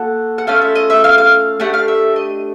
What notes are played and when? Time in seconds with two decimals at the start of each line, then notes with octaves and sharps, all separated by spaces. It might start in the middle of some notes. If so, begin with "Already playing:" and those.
Already playing: A#3 F#4 A4 F#5
0.38 F#5
0.47 A3 C#4 F4 A4 F5
0.61 E5
0.75 D#5
0.90 E5
1.04 F5
1.18 F5
1.60 A3 D4 G4 F#5
1.74 F5
1.88 E5
2.16 D#5